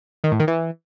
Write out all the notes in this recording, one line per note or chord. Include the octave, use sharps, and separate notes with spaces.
D#3
A2
D#3
E3